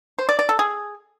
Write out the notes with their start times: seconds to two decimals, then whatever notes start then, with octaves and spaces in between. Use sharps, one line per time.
0.19 C5
0.29 D5
0.39 D5
0.49 A4
0.59 G#4